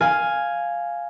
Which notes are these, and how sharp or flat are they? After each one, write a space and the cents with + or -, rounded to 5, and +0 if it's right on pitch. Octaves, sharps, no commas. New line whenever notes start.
F5 +0 G#5 +0